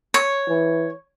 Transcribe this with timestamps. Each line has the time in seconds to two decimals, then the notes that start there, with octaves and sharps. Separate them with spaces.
0.14 C#5
0.49 E3